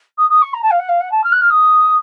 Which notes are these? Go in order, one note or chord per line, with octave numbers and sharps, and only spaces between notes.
D#6
D#6
C#6
A#5
A5
F5
F#5
F5
F#5
A5
F6
F#6
F6
D#6